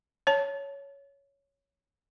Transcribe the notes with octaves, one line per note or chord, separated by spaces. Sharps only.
C#5 A5